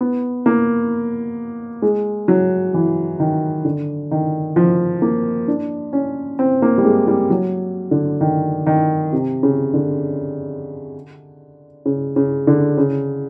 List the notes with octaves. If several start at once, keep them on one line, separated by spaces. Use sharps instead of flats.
B3
A#3
G#3
F#3
E3
D#3
D3
D#3
F3
A#3
D4
C#4
C4
A#3
G3
G#3
G3
F#3
D3
D#3
D#3
C3
C#3
D3
C#3
C#3
D3
C#3